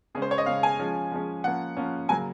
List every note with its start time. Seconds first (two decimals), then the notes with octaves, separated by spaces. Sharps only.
0.15 C#3 G#3 C#4 G#4
0.22 C5
0.31 C#5
0.38 D#5
0.46 C#3 G#3 C#4 F5
0.63 G#5
0.79 F3 G#3 C#4
1.11 F3 G#3 C#4
1.44 F3 A#3 C#4 F#5
1.77 F3 A#3 C#4
2.09 C#3 F#3 A#3 G#5